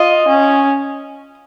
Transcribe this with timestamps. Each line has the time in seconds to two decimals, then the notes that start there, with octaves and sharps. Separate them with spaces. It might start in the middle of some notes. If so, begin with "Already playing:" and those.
Already playing: F4 D#5
0.28 C#4